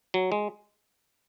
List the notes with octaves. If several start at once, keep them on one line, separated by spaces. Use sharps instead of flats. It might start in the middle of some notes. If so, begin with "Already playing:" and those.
F#3
G#3